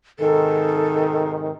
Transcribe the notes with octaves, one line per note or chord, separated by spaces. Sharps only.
G#2 C3 D#3 A4